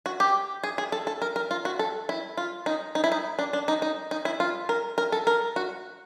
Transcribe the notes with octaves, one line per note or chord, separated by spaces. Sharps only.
F#4
G4
G#4
G#4
A4
A4
A#4
A#4
F4
F#4
A4
E4
F4
D#4
D#4
E4
D#4
D4
D4
D#4
D#4
D#4
E4
F4
A#4
A#4
A4
A#4
F#4